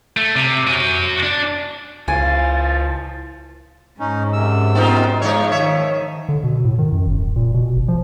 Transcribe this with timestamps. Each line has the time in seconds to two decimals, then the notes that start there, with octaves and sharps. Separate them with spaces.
0.17 A3
0.35 C3
0.67 F#4 G#5
1.23 D4
2.08 C#2 E3 F4 G#5 A6
4.00 G#2 C#4 D#4
4.33 F#2 C3 E6
4.75 B3 D#4 F4
5.22 F3 G#3 D#4 C#5
5.52 D#3 C#5 E5
6.29 D3
6.44 B2
6.65 A2
6.79 D#3
6.93 F#2
7.07 G1
7.20 D#1
7.36 A#2
7.54 B2
7.76 G#1
7.88 F3